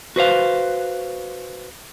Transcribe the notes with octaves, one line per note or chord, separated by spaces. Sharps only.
F#4 B4 C5 F5